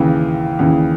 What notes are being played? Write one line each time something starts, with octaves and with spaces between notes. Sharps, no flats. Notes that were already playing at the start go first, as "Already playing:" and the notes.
Already playing: D#2 C#3 E3
D#2 C#3 E3